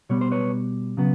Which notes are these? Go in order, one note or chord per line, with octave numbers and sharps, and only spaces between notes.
B2 G3 B3 C#5
C5
B4 C#5
C#3 F#3 B3